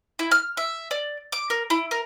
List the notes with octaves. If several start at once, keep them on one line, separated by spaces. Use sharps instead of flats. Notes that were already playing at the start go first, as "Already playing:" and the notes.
E4
F6
E5
D5
D6
A#4
E4
A#4